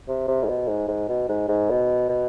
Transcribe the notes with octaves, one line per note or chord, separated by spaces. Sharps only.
C3
C3
G#2
B2
G#2
G#2
B2
G#2
G#2
B2
B2